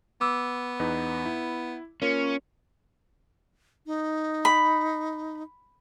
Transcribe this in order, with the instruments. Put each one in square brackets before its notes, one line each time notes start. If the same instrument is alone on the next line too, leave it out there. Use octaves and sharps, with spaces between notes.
[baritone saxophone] B3 [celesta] D6 E6
[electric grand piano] E2 D#4 B4
E4
[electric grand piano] A#3 F4 A#4 [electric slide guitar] C#4
[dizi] D#4
[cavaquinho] B5